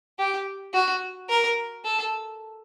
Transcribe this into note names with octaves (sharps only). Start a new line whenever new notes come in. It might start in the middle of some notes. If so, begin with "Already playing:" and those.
G4
F#4
A#4
A4